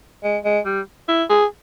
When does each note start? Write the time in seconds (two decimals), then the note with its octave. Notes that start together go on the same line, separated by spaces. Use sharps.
0.23 G#3
0.44 G#3
0.65 G3
1.08 E4
1.30 G#4